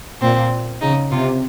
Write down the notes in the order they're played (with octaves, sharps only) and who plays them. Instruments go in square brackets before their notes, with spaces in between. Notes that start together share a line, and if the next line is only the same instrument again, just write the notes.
[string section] A#2 [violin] C4
[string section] C#3 [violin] D#4
[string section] C3 [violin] F4